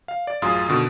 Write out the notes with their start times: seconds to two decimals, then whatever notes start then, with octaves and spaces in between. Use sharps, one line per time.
0.08 F5
0.27 D5
0.42 A1 F#2 F4 G#4 C6 D#6
0.68 B2 D3 D#3